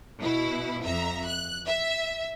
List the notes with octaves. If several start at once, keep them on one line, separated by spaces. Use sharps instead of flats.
B2 E4
F2 E5 A#5
F#6
E5